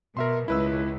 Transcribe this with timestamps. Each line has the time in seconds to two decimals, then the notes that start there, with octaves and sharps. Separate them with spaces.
0.17 B2 A#4 E5 C6
0.48 C#2 E4 B4 E6